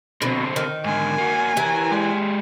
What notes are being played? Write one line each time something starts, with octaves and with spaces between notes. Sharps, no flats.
B2 D3 C4
D#3
G#2 D3 G#5
A#3 F#4
E3 G4 A#4
G#3 G4